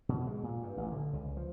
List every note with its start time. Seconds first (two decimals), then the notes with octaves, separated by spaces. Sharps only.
0.09 B2
0.27 G#3
0.43 A#2
0.63 G2
0.77 A1
0.92 D3
1.13 C#2
1.37 F3